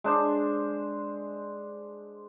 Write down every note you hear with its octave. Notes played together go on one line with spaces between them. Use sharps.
G#3 D4 C5